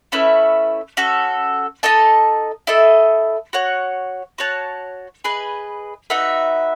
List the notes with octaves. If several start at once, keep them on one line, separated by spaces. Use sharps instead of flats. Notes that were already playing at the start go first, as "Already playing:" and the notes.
A3 C#4 E4 B4
C#4 F#4 A4
D#4 A4 D#5 A5
E4 A4 D#5
F#4 C#5 F#5
F#4 C#5 F#5 A5
G#4 B4 D#5
D#4 F#4 B4 E5